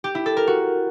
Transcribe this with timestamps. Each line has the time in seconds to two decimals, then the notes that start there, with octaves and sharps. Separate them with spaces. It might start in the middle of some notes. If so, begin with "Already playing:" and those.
0.04 G4
0.15 E4
0.26 A4
0.37 A#4
0.47 F#4